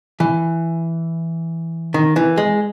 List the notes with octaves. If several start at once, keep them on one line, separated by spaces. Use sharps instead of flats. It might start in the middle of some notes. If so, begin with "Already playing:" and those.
E3
D#3
E3
G#3